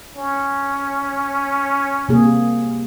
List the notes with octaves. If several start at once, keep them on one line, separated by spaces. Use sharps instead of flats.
C#4
C3 A#3 G#4